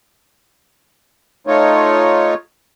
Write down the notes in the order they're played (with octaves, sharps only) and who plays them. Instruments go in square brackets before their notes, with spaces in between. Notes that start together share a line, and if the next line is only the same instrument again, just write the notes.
[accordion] A3 D#4 F4 C#5